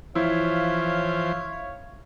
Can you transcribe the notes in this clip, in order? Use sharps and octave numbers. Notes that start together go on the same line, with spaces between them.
E3 F3 E4 C5 C#5 F5